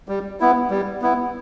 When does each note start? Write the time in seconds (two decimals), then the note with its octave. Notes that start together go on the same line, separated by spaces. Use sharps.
0.08 G3
0.40 B3 E4
0.70 G3
1.02 B3 E4